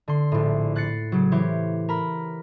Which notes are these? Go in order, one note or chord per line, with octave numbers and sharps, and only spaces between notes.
D3 C6
A#1 A2
F#6 A6 C7 C#7
C#3 F#3
E3 G4 C5 C#5
A#4 A#5 B5